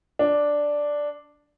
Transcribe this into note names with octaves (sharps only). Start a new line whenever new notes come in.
D4